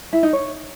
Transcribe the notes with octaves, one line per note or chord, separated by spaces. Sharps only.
E4
D#4
C#5